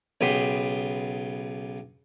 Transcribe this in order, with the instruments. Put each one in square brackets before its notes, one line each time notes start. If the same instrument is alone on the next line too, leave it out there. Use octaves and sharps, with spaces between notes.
[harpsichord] B1 C#3 B3 G4 B5 C6